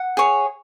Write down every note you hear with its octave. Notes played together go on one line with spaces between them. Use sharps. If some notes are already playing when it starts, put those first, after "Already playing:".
Already playing: F#5
G#4 C#5